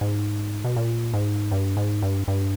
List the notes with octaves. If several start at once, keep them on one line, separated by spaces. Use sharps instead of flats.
G#2
B2
A#2
G#2
G2
G#2
G2
G2